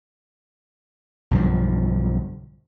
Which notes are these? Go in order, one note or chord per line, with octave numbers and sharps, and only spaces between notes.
B1 G2 D3 F3